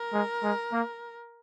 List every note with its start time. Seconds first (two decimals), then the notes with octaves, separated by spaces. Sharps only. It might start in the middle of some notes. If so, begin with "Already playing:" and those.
Already playing: A#4
0.13 G#3
0.43 G#3
0.73 A#3